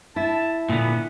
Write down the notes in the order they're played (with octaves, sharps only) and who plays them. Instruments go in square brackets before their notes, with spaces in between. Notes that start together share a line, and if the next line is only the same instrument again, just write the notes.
[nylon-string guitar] E4 [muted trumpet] A5
[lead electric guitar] A#2 D3 [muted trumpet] B3